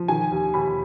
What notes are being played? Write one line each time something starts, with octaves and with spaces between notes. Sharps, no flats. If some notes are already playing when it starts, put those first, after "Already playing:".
Already playing: F3
D#3 G#5
D#2
D#2 B5